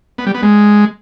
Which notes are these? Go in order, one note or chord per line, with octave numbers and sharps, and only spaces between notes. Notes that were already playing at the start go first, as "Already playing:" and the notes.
B3
G3
B3
G#3